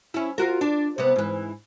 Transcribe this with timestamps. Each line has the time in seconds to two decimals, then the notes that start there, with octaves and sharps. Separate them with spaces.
0.14 C#4 E4
0.38 F4 F#4 A#4
0.61 D4
0.98 C3 B3
1.16 G#2 E3